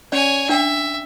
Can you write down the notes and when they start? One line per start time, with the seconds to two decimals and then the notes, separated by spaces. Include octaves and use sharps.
0.12 C#4 C#5 D5 G#5
0.49 D4 E5 G5